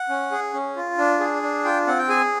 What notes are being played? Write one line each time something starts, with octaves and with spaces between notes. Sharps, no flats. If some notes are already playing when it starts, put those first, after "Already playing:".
Already playing: F#5
C#4
G#4
C#4
F4
D4
G#4
D4
F4 G5
C4 F#5
G5
G#4 G#5